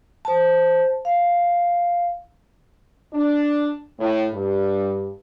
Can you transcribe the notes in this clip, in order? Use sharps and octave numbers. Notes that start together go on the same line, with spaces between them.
C5 A5
F5
D4
A2
G2